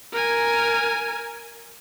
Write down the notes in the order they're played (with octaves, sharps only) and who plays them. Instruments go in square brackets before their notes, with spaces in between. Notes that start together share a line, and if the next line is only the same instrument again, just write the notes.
[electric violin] A#4 G#5